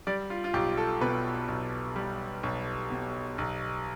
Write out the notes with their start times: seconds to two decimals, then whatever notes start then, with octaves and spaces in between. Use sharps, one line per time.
0.07 G3 D5
0.30 F4
0.44 F4
0.53 B1 G4
0.77 A4
1.01 B2 B4
1.48 B1
1.96 G3
2.43 B1
2.91 B2
3.38 B1